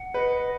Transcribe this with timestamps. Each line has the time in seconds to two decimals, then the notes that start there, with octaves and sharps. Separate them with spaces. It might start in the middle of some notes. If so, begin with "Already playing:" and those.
Already playing: F#5
0.14 B4 D#5